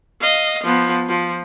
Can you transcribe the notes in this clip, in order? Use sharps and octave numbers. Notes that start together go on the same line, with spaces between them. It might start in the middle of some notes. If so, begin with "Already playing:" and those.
D#5 F5
F3 B3
F3